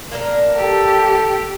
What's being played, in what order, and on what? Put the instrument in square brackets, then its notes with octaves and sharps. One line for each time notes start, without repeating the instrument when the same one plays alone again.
[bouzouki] A#3 D4 A#4
[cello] G4 [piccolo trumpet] A4